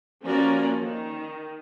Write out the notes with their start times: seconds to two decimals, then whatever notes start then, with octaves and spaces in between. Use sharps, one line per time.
0.23 F3 A#3 C#4 F#4 A#4 D5
0.81 D#3